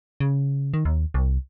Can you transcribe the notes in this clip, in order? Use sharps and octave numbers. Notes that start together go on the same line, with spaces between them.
C#3
D#3
D#2
C2